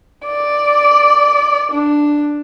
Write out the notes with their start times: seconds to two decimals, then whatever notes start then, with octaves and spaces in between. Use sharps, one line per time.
0.26 D5
1.72 D4